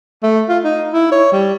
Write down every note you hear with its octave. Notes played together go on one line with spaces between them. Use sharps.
A3
F4
D#4
E4
C#5
G3